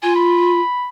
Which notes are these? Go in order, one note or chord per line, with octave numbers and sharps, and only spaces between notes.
F4 G#5
B5